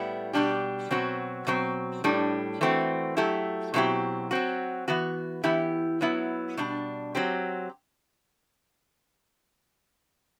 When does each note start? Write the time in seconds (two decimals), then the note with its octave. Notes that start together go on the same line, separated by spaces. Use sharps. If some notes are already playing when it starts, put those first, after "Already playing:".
Already playing: A2 G3 B3 E4
0.33 B2 G3 D4 G4
0.91 B2 F#3 C4 F#4
1.47 B2 F#3 C4
2.04 A2 G3 D4
2.61 E3 A3 C4 F#4
3.17 F#3 A3 E4 G4
3.74 B2 F#3 C4 E4 G4
4.31 F#3 C4 F#4
4.88 E3 B3 F#4
5.44 E3 B3 E4 G4
6.01 F#3 B3 E4
6.57 B2 G3 D4
7.15 F#3 C4 G4